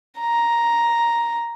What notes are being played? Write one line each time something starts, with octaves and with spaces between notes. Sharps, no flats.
A#5